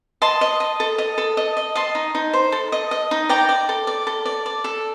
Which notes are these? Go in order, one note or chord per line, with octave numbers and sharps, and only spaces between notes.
D#5 A5 C6
D#5
D#5
A4
D#5
A4
D#5
D#5
D#5 A5 C6
D#4
D#4
C5
A4
D#5
D#5
D#4
D5 G5 A#5
D5
A4
D5
A4
D5
D5
A4